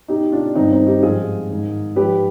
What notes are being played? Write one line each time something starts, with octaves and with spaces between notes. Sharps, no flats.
B2 D#4 G4
D4 F4
G2 D#3 C4 D#4
C4 D#4
D#4 G4
G#2 F3 F4 G#4
G#2 D#3
G#2 F3 G4 B4